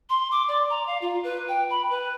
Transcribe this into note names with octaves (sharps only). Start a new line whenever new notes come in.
C6
D6
D5
A#5
F5
F4
B4
G5
B5
B4